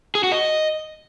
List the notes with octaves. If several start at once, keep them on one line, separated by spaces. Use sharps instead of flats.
G#4
F#4
D#5